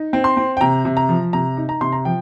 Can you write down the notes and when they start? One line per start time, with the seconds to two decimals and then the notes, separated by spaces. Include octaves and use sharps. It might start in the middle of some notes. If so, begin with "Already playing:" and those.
Already playing: D#4
0.13 C4
0.24 C6
0.37 C4
0.57 G5
0.61 C3 A#5
0.85 C3
0.97 A#5
1.09 F3
1.33 C3 A#5
1.57 D#4
1.69 A#5
1.81 C3 C6
1.92 A#5
2.05 F3 G5